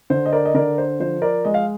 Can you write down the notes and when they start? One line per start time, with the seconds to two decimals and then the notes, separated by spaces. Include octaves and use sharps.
0.10 D3 C5
0.26 D#5
0.32 A#4 D5
0.45 D#5
0.54 D3 A#4 D5
0.78 C5
1.00 F3 C5
1.22 A#4 D5
1.45 G#3 D#5
1.54 F5